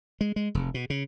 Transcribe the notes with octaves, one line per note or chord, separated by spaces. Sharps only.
G#3
G#3
F1
B2
C#3